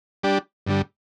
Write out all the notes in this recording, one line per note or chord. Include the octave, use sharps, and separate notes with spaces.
G3 D4 G4
G2 D3 G3